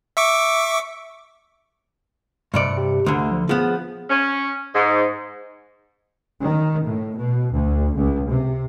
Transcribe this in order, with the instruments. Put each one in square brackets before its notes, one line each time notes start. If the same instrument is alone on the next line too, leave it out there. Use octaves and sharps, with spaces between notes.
[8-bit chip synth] E5 C#6 D6
[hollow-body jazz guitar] G2 C3 D5 [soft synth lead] C#7
[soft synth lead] G4
[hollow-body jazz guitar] D2 D3 [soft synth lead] A3
[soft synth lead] F3
[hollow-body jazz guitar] F3 B3 [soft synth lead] G#4
[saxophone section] C#4
G#2
[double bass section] D#3
A2
B2
D2
C#2
C3